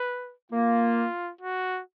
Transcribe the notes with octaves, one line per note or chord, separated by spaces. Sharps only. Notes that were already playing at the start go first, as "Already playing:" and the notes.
Already playing: B4
A#3 F4
F#4